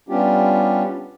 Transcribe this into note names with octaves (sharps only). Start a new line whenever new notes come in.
G3 B3 C#4 D4 F4 G4